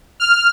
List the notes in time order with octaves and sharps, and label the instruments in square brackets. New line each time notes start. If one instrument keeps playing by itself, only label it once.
[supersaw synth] F6